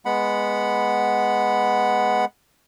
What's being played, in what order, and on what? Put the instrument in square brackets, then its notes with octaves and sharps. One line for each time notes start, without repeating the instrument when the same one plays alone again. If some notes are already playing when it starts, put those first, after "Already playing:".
[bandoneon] G#3 B3 F#5 B5